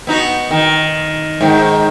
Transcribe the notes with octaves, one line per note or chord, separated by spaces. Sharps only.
B3 D#4 F#4
D#3
G#2 D#3